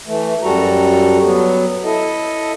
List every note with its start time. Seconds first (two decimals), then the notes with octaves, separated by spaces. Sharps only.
0.07 E3 A3
0.43 F#2 G3 F#4 A4 A#5
1.24 F#3 B3
1.84 E4 A4 D#5